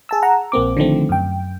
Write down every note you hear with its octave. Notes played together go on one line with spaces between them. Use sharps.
G#4 A5 E6
F#5 A#5
A#1 A#3 C4 D6
D3 D#3 F3 A3 C4
F#2 G5